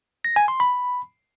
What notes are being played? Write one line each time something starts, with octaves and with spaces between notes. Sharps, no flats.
A#6
G#5
C6
B5